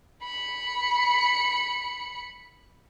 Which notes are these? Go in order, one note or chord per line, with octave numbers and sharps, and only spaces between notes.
B5 C#7